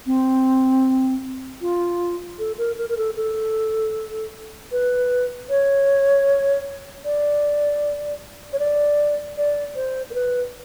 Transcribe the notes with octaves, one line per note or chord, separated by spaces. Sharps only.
C4
F4
A4
A#4
A#4
A#4
A4
A4
B4
C#5
D5
C#5
D5
D5
C5
A#4
B4